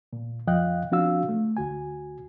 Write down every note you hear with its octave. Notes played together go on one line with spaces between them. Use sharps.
A#2
F2 F3 D#5 F5 G5 F#6
F3 C4 D4 F#4 F5 E6
A3
D2 F#4 G#5